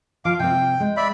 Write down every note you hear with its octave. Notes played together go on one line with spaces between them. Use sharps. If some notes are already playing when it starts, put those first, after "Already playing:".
F3 F5 D6
C3 C4 G5
G#3
D5 E5 B5